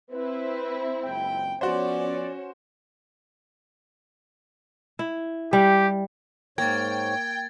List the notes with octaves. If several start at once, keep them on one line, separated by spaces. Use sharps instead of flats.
C4 E4 B4
F#1 C#2 G5
F3 B3 C#4 F#4 C5 D5
E4
G3 G4
G#2 A#3 C#5 G5 G#6 A6